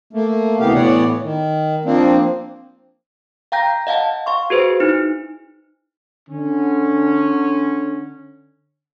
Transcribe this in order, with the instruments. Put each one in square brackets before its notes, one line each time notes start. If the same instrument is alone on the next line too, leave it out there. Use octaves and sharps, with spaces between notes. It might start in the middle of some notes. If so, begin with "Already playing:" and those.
[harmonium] A3 A#3
D2 C3 E3 B3 G4 F5
A2 E3 B3 C#5 D5 F#5
D#3
F3 A#3 C4 D4
[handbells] F5 G5 A#5 G6 A#6
D#5 F5 F#5 A5
F5 C6 C#6
F#4 G#4 B4 C5
D#4 E4
[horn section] D3 C#4